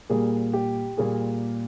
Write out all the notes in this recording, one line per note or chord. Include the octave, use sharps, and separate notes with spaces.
A#2 G3 A#3 G#4
G4
A#2 G3 A#3 G#4